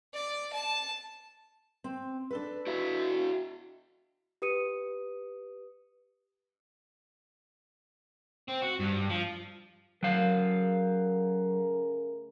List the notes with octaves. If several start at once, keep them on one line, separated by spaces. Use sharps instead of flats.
D5
A5
C4
D4 A4 B4
E4 F#4 E5
G4 B4 D#6 C#7 D#7
C4
F#4
G2
F3
C#3 F#3 A3 A#4 F5